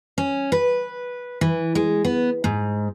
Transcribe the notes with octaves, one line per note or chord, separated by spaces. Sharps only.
C#4
B4
E3
G#3
B3
G#2